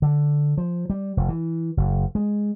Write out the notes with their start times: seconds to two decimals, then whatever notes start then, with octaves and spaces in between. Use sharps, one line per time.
0.02 D3
0.57 F3
0.90 G3
1.17 F1
1.29 E3
1.77 F#1
2.15 G#3